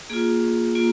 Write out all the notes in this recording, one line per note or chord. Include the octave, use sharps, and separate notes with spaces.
A#3 F4 G#4
A#3 F4